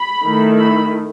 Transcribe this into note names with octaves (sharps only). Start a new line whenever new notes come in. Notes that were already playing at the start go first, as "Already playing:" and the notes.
Already playing: B5
D#3 A3 E4
B5